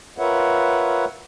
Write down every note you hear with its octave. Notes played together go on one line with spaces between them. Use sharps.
F4 A#4 B4 C#5 E5 F#5